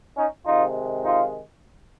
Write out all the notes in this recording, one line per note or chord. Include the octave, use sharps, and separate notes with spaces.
C#4 D#4
C3 D#3 G#3 D#4 F4
D#4 F4